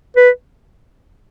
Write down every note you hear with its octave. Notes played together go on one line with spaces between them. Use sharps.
B4